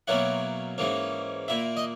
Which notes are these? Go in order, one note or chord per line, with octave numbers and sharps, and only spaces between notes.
B2 F#3 A#3 C#4 E4 F#5
G#2 E3 A#3 C#4
A#2 A#3 E4 E5
D#5